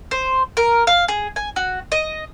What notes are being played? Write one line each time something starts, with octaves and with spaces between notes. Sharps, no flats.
C5
A#4
F5
G#4
G#5
F#4
D#5